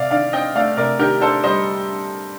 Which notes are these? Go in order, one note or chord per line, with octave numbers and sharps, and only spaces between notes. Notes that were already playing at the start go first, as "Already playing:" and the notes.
Already playing: C3 D5 F5
D#3 D5 F5
C4 D#5 G5
A3 D5 F5
C3 A#4 D5
D#3 G4 A#4
D4 A4 C5
G3 C5 D#5